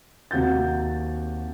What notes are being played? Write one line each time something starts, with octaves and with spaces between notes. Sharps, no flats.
D#2 C3 F#4 G6 A6